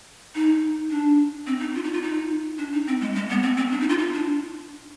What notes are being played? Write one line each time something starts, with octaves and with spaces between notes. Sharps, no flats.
D#4
D4
C4
D#4
F4
D#4
F4
D#4
D4
D#4
C4
G#3
G#3
B3
C4
C4
D4
D#4
F4
D#4
D4